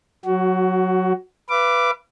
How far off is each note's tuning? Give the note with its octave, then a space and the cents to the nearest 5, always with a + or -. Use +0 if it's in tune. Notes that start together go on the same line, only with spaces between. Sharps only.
F#3 -10 F#4 +20
B4 +0 F5 -45 D6 +0